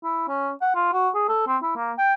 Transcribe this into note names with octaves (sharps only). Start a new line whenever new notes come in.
E4
C#4
F#5
F4
F#4
G#4
A4
C4
E4
A#3
G5